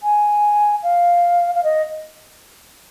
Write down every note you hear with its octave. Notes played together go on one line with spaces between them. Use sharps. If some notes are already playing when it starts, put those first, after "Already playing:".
G#5
F5
F5
D#5